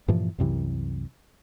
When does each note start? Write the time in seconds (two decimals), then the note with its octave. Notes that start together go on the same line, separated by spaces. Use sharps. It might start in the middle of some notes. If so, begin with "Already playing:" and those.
0.08 G2 A#2 E3 F3
0.38 C2 F#2 C3 E3